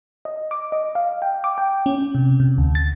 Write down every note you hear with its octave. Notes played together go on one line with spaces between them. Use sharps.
D#5
D6
D#5
F5
G5
D6
G5
C#4
C3
C3
D2
A6